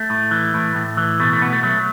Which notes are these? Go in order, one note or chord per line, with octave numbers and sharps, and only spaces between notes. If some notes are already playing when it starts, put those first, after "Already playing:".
Already playing: A3
A2
E3
A2
A2
E3
B2 A3
A3
B2 B3
A3
F#3 A3